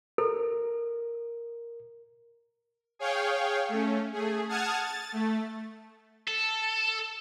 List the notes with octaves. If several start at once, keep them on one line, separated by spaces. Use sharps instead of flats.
A4 A#4
G#4 C#5 F5 G5
A3 C#4
A3 G#4
F#5 A5 D#6 F6 G#6
A6
A3
A4